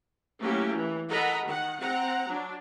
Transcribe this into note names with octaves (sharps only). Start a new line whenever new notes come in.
F#3 A3 A#3 C#4 E4 G4
E3
A4 A#4 D#5 F#5 A#5 B5
D#3 F#5
C4 F#5 A#5
F#3 D4